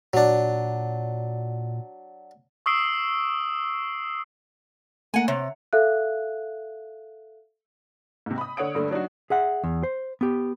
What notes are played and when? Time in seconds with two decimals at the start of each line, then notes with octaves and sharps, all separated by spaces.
0.13 A#2 F#3 D4
2.66 C#6 D#6 E6 C7 D7
5.14 A3 A#3 F#5 G#5 A#5
5.28 C3 C#5
5.73 A4 E5 F5 F#6
8.26 G#2 C3
8.38 B5 D#6
8.57 D3 C#5 F#5 D#6 D7
8.75 G2 D3 A3
8.91 F#3 D4 D#4 F#4
9.30 G#4 E5 F#5
9.64 E2
9.83 C5
10.21 B3 G4